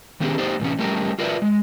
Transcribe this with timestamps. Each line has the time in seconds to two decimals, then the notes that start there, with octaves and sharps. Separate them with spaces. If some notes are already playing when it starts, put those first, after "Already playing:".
0.20 D#3 B3 C#4 G4 G#4
0.38 A#3 D#4 G4 C5 D5 D#5
0.60 A2 C3 E3 C#4
0.79 F#3 G3 A3 C#4 G4 A#4
1.19 F4 F#4 A#4 B4 D5 E5
1.42 G#3